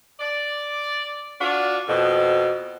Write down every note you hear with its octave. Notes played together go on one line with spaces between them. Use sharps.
D5
D4 F4 F#4
F2 B2